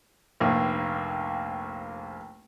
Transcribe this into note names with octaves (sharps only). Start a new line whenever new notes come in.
F1 A#1 A#3